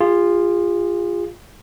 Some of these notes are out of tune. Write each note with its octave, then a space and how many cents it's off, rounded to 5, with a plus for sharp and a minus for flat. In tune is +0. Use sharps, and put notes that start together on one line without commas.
F4 +0 G#4 -35